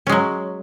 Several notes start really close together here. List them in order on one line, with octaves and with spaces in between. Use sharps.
C#4 G#3 F#3